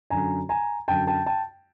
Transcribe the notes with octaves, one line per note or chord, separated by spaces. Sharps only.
F#2 D3 F#3 G#5 A#5
G#5 A#5
F#2 D3 F#3 G5 A5
G5 A5
G5 A5